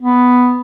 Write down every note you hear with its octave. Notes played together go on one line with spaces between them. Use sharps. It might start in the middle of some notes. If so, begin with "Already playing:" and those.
B3